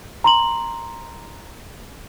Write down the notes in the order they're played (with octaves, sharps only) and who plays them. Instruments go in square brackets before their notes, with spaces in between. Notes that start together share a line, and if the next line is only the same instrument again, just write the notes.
[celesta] A#5 C6 F#7